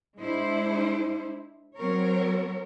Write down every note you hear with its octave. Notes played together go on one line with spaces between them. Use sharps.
G#3 D4 E4 C5
F#3 C4 A#4 C#5